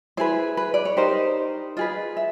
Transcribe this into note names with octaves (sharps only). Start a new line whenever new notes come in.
E4 G#4 B4 C5
B4
D5
C#5
D#4 G4 A#4 C5
F4 G#4 B4 D#5
E5